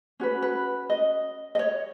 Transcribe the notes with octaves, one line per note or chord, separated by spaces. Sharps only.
C#4 F#4 B4
B4
D#5
D#5
C#5